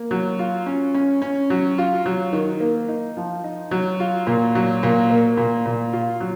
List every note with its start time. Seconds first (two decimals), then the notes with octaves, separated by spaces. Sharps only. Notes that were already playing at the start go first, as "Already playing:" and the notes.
Already playing: A#3
0.11 F#3
0.39 F4
0.66 C#4
0.94 C#4
1.22 C#4
1.50 F#3
1.78 F4
2.06 F#3
2.33 D#3
2.60 A#3
2.88 D#4
3.17 F3
3.44 D#4
3.71 F#3
4.00 F4
4.27 A#2
4.55 F#3
4.83 A#2
5.10 A#3
5.37 A#2
5.66 A#2
5.93 F4
6.20 F#3